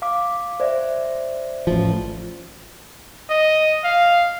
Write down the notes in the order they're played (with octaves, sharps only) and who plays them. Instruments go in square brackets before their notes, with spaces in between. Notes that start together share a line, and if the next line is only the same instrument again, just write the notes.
[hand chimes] F5 D6
C5 D5 E5
[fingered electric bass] A1 F3
[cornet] D#5
F5